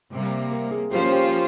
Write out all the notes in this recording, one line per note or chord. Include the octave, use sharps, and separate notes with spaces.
C3 G3 A#3
A#4
G#4
F3 A#3 C#4 F4 G4 C5
G4